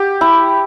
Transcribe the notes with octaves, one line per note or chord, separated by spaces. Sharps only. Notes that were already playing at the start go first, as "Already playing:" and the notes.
Already playing: G4
E4